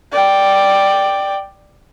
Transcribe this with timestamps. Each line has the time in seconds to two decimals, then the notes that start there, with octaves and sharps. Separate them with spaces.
0.13 D5 G5